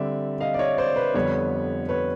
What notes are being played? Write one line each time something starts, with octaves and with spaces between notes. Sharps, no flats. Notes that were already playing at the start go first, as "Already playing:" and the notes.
Already playing: D3 G3 C4 D5 E5
D#5 F5
D5
C#5 D#5
C5 D5
B4
F2 D3 G3 B3 B4 C#5
B4 C#5